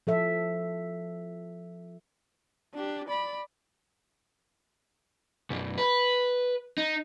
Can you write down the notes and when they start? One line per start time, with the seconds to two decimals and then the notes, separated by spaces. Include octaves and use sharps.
0.07 F3 A4 E5
2.74 D4 G4
3.09 D5 B5
5.50 B1 F#2
5.78 B4
6.78 D#4